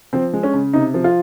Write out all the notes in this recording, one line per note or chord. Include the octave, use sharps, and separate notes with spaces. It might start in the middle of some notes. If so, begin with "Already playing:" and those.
F3 C4
G#3
C#4
C#3
C3 D#4
F3
F4